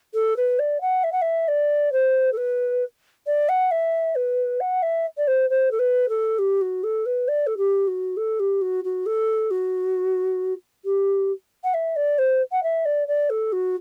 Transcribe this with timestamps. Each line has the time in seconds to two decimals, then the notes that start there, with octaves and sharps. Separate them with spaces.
0.14 A4
0.37 B4
0.59 D5
0.81 F#5
1.04 E5
1.12 F#5
1.22 E5
1.48 D5
1.93 C5
2.32 A4
2.37 B4
3.27 D5
3.49 F#5
3.71 E5
4.15 B4
4.60 F#5
4.82 E5
5.17 D5
5.27 C5
5.50 C5
5.71 A4
5.79 B4
6.09 A4
6.39 G4
6.61 F#4
6.84 A4
7.06 B4
7.28 D5
7.47 A4
7.57 G4
7.87 F#4
8.17 A4
8.40 G4
8.61 F#4
8.84 F#4
9.06 A4
9.51 F#4
10.85 G4
11.64 F#5
11.74 E5
11.96 D5
12.18 C5
12.52 F#5
12.63 E5
12.85 D5
13.08 D5
13.30 A4
13.52 F#4